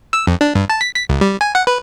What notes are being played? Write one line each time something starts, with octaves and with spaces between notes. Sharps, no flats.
E6
F2
D4
G2
A5
B6
B6
C#2
G3
G#5
F#5
B4